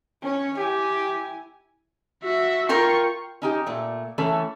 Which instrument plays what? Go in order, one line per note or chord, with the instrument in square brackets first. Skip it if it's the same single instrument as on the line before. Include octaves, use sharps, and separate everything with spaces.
[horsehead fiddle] C#4 C#5
[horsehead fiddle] E4 G#5 [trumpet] G4
[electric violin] F#4 E5
[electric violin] F4 C#6 [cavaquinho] A#4 G5 C6
[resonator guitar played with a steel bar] C#4 D#4 G4
A#2 A3
E3 A3 C#4 A4